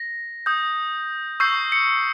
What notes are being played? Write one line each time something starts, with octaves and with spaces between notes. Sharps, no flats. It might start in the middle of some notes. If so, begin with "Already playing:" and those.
Already playing: A#6
D#6 G6
C#6 E6 G6 C7
C#7